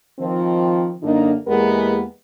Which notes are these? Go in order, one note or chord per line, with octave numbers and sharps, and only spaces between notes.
D#3 F3 C4
F#2 D3 A#3 D4 D#4
E2 G#3 A#3 B3 G4 A#4